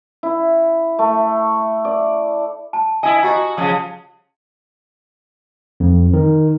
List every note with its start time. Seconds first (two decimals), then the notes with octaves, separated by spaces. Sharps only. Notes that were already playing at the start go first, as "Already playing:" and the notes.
0.23 E4
0.99 A3
1.85 D5
2.73 A5
3.03 E4 D#5 G#5
3.23 F#4 G4 D#5 A#5
3.57 C#3 F3 D#6
5.80 F2
6.13 D#3